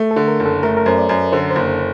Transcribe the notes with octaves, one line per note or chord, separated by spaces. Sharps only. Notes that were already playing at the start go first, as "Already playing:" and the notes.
Already playing: A3
A4
D3
A#4
F#1
A4
A3 A#4
A#4
F#2 C5
D5
F#2
D3 C5
C5
F#1
A4